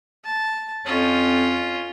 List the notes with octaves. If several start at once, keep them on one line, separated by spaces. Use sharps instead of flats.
A5
F2 C#4 F4